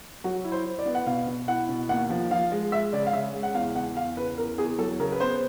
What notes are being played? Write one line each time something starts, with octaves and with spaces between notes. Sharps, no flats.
F#3 F#4
E4
C5
E4
D5
B3
F#5
B2 F5
B2
E4 F#5
B2
D#2 F#5
F3
F3 F5
G#3
G#3 E5
C#3 D5
F5
C#3 E5
G#3
F#5
E2 F5
E2 F#5
E2 F5
C#3 B4
E2 A#4
E2 G#4
F#3 A4
C#3 A#4
B4
B3 C5